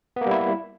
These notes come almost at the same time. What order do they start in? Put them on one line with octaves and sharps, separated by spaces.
B3 A#3 G3 E4